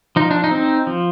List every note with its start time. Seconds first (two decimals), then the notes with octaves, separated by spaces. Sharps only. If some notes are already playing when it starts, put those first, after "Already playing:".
0.16 F3 D#4
0.31 D4
0.44 D#4
0.51 C4
0.87 F3